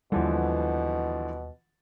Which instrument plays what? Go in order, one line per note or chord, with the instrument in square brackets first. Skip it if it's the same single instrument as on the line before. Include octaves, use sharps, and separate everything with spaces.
[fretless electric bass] D#2 G3 [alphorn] B2 [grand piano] D3 E3 F3